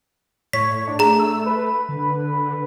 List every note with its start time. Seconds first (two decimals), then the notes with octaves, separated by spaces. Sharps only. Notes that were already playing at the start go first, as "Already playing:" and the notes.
0.53 A2 C#5 B6
0.87 D4
0.99 A3 G#4 A#5
1.19 E6
1.46 B4
1.89 D3